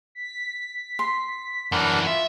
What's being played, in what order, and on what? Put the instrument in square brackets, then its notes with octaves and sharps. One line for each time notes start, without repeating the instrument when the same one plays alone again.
[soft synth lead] B6
[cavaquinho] C6
[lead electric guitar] F#2 E3 [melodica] D4 A#4 F#5
[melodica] F4 [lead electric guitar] E5